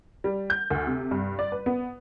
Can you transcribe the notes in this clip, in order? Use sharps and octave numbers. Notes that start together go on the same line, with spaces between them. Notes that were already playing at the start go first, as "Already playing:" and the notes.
G3
G6
D2
C3
G2
D5
B4
B3